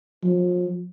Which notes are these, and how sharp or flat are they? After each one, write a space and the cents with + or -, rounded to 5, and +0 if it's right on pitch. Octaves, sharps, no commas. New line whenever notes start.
F3 +35